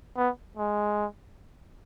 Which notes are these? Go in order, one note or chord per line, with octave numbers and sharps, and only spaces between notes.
B3
G#3